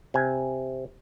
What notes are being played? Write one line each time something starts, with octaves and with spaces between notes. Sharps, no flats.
C3 G#5